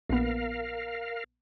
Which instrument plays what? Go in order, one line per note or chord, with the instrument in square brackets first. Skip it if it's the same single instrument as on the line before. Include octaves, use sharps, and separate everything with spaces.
[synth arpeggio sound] A#1 B3 [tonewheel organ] A#4 F5